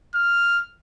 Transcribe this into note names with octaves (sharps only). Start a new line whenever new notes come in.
F6